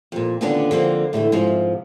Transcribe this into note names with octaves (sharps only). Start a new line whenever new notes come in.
F2 A#2
D#2 A#2 D3 B3 C#4 D4
D3 F3 A#3 C4
A2 D3 E3 A3
G#2 C3 F3